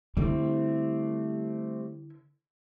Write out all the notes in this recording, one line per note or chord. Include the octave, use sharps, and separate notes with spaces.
D3 G3 A3 C4 E4